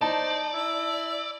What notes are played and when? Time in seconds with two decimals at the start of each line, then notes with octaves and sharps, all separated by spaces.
0.01 D#4 C5 D5 A5
0.54 E4 E6